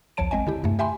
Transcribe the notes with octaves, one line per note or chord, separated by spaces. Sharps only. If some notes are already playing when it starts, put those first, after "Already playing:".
B1 E2 F3 C#5 A5 D7
A1 G#3 C4 D#5 G#5
D3 E4 G4
E2 G2 C3 A3
G4 E5 G5 G#5 B5 C6